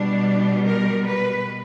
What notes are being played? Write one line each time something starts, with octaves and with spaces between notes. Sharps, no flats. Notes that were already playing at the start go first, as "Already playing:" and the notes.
Already playing: B2 G3 D4
A#4
B4